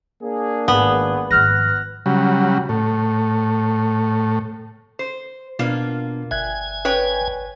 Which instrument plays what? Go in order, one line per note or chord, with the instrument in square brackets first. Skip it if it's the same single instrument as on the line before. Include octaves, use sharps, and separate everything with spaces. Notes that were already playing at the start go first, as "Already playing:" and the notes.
[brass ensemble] A#3 D4 G#4
[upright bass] G#1 [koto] B3
[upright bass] G#1 F3 [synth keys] F6 F#6 A#6
[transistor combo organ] C#3 F#3 G3
A2
[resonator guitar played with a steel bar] C5
[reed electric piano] B2 B3 D4 [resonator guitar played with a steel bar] A#3 F4
[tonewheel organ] G1 G#5 [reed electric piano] E5 F#6 G#6
[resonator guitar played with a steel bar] B4 C#5 G5